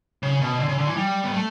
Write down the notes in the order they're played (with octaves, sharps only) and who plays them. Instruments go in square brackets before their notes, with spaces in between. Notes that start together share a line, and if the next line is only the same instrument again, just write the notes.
[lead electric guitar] C#3
B2
D3
C#3
D3
E3
G3
B3
A3